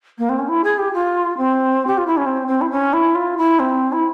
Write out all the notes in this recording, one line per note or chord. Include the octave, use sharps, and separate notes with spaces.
A#3
C4
C#4
E4
G#4
G4
F4
C4
G4
F4
E4
C#4
C4
C4
E4
C#4
E4
F4
E4
C4
E4